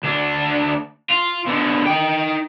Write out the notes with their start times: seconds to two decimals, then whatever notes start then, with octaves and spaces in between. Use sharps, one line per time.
0.03 D2 D4
1.10 F4
1.47 B2 D3
1.87 D#4 G5